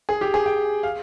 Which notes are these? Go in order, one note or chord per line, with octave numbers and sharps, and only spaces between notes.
G#4
G4
G#4
G5
F5